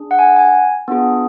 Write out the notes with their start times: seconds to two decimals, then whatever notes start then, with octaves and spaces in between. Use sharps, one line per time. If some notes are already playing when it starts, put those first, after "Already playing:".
Already playing: D4 G#4
0.11 F#5
0.19 G#5
0.28 F#5
0.36 G#5
0.88 B3 D4 F4 G#4